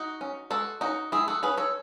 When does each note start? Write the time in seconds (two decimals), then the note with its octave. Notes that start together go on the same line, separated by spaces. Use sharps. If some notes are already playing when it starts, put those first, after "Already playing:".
Already playing: D#4 F#4
0.21 C#4
0.50 G#3 F#4 A4
0.81 C#4 D#4 F#4
1.12 G#3 E4 G#4
1.28 F#4 A4
1.43 C#4 G#4 B4
1.57 A4 C#5